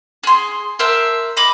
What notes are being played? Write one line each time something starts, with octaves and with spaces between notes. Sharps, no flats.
G#4 C6
A#4 C5 E5 A5
D#5 B5 D6